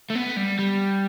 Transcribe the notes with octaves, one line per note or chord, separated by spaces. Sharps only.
A3
B3
G3
G3